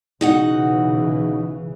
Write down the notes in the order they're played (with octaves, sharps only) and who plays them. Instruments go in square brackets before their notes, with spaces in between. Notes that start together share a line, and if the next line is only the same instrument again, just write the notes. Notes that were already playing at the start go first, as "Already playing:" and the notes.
[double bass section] B1 C#3 E3 [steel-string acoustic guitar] D#4 F#4 F#5